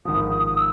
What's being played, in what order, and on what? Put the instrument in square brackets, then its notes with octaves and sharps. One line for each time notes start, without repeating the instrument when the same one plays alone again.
[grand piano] G#1 G#2 F3 [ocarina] D#6
[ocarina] D#6
D#6
E6